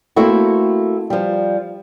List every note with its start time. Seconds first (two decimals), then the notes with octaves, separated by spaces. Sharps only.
0.16 A3 A#3 C4 E4 F#4
1.10 F3 G3